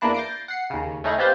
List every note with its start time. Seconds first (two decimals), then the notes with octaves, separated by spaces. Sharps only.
0.01 E2 A#3 D4 E4 F#6
0.14 G6 A6 A#6 C7 D7
0.48 F#5 C7 C#7
0.70 D#2 C#3
1.04 A3 C#4 D#4 E4 G#4
1.18 C4 C#4 F4 G4 B4 C5